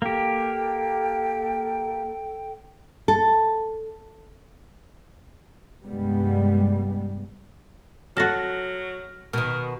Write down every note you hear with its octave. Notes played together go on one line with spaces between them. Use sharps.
A#3 G4 A4 G5
A4
C2 G2 G3 G#3 B3
F#3 F#4 A4 F6 A#6
B2 D#3 A#4